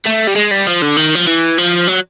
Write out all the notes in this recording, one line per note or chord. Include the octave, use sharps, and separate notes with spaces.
A3
G3
G#3
G3
F3
D3
D#3
F3
E3
F3
F#3